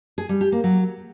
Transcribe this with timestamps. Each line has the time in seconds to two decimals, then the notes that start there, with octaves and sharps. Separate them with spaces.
0.18 G#4
0.29 G3
0.41 G4
0.52 A#3
0.64 F#3